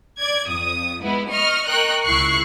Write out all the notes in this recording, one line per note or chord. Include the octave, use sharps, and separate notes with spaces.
D5 G#6
F2 D#6
G#3 B3 E4
D#5 C#6 F6
A#4 D#5 G5 C#6 F#6
C#2 E4 C#6 F#6 C7 C#7